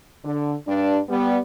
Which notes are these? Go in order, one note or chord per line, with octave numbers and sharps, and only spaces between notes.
D3
G2 D4
G3 B3